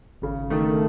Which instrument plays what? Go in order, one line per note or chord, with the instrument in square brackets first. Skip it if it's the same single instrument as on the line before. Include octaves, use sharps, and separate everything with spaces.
[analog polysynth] G#1 [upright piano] C#3
[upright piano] D#3 [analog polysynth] A3